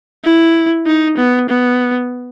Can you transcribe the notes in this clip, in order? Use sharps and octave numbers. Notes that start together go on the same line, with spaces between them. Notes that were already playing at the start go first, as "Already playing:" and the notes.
E4
D#4
B3
B3